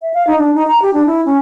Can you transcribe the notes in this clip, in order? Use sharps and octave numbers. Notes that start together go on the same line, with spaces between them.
E5
F5
D#4
D4
D#4
A#5
G4
D4
E4
C#4